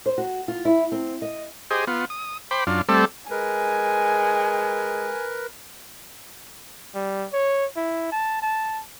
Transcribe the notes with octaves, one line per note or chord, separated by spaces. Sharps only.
C5
F#4
F4
E4
C4
D#5
G4 G#4 C5 D#5
B3 F4
D#6
C5 G5 B5 D6
F#2 D4 F4
G3 A3 C4 A4 D5
G#3 A#4 B4 G#5
G3
C#5
E4
A5
A5